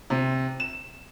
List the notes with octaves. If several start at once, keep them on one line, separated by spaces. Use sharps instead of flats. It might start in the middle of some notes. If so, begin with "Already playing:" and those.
C3
E7